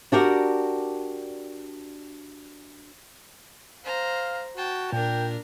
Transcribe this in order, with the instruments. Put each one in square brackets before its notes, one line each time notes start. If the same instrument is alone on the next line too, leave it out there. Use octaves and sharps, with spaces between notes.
[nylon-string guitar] D4 F#4 G4 A#4
[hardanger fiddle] C5 A#5 [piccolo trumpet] F5
[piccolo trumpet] F#4 [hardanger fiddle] G5 A5
[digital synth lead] A#2 [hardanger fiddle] D4 A#4 [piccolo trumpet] G5